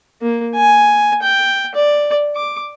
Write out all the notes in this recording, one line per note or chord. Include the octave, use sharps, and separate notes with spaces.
A#3
G#5
G5
D5
D6